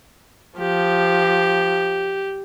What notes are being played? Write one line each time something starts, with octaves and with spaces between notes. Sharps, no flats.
F3 G4